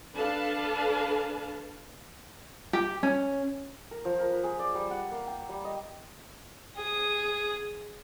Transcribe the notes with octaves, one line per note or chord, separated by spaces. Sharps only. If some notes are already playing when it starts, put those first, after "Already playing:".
D4 A4 B4 F5 A5
G4
C#4
A#4
F3
A#4
B4
G#4
D5
G3
F#5
A#3
G5
G3
D#5
G#4 D#6